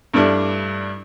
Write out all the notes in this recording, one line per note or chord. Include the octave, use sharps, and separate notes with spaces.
G2 G3 A3 D4 E4